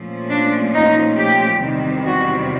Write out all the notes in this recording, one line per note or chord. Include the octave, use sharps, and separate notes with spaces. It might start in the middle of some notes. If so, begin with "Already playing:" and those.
Already playing: A#2 F3 A3 C#4
D4
D#4
G4
E2 C3 D#3 G3
F#4